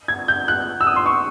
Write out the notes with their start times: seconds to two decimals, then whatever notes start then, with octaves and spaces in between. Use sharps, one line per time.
0.08 G#6
0.28 G6
0.48 F#6
0.81 E6
0.87 D#6
0.96 C6
1.06 C#6